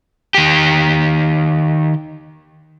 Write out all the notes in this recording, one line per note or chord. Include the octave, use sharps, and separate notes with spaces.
D#3 G4